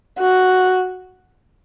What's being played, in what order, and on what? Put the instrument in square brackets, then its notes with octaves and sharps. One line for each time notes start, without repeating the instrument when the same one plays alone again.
[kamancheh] F#4